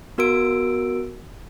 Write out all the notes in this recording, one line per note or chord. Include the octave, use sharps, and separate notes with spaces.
B3 F#4 A#4 E6 D7